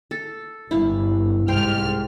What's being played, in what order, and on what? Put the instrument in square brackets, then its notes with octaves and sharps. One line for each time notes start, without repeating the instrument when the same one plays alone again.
[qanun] A4
[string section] G1 [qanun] E4 F5
[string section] C2 G#2 F6 [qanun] C5 G5